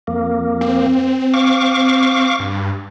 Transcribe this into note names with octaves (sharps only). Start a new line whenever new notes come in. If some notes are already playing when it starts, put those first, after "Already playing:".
F2 A#3
C4
F5 C#6 D6
G2